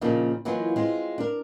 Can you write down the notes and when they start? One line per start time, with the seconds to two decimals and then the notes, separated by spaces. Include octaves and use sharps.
0.01 A#2 C#3 F3 A#3 D4 D#4
0.45 E3 F#3 A#3 D#4 F4
0.76 G#3 C4 F4
1.18 D4 A#4